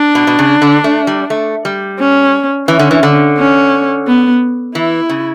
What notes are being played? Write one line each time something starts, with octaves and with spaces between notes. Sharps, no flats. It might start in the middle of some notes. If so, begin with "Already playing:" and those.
Already playing: D4
B2
B2
C#3
D3
A3
G3
A3
G3
C#4
E3 C#4
D3
E3
D3
C#4
B3
E3 E4
C#3